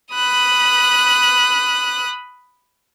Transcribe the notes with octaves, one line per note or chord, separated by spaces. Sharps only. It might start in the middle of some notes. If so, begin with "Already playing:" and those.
B5 D#6 F#6